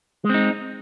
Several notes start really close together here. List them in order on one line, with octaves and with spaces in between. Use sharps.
G#3 C4 D#4